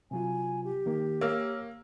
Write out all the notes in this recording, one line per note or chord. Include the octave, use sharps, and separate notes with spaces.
C3 F#3 F4 G#5
G4
D#3 A#3
A#3 C#5 E6 F6